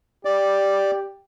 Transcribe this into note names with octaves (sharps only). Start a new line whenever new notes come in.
G4 D5